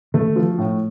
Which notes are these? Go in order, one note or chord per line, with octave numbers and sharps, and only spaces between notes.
D#3 A3
F3
A2